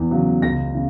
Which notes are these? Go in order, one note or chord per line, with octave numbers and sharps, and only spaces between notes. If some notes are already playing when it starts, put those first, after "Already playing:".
Already playing: E2
C#3 F#3
C#2 A#6
C#3